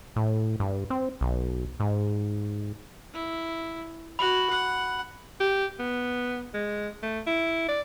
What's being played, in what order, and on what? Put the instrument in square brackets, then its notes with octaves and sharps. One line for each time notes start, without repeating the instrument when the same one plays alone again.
[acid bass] A2
G2
C4
B1
G#2
[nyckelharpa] E4
[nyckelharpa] F#4 [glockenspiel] B5 F#7
[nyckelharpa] F#5
[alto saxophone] G4
B3
G#3
A3
E4
D5